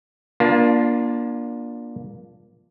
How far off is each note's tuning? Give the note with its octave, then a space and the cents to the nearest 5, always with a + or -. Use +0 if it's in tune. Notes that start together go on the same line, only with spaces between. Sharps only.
A#3 +30 D4 +0 F4 +0